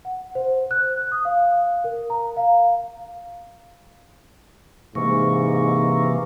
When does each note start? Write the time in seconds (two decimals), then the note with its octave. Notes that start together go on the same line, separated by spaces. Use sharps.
0.05 F#5
0.35 C5
0.71 F#6
1.12 D#6
1.25 F5
1.84 A#4
2.10 A#5
2.37 F5
4.95 G#2 C3 E3 A#3 C#6